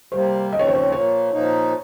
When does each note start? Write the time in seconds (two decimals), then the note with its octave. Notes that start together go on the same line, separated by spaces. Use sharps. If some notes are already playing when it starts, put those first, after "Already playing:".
0.12 C3 G3 A#3 C5
0.53 D#2 C#3 F3 C4 D#5
0.59 C#5
0.67 C5
0.75 C#5
0.92 A#2 F3 A#3 C#5
1.33 A#2 F3 A#3 D#4